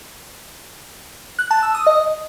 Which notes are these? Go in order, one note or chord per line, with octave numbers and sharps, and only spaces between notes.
F#6
A5
E6
D#6
D#5